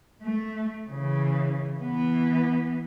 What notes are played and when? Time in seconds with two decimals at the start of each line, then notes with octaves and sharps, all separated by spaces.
0.22 A3
0.90 C#3 E3
1.80 E3 B3